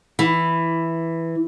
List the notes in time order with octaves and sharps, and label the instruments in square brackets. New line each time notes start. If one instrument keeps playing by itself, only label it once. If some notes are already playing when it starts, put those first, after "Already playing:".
[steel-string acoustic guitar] E3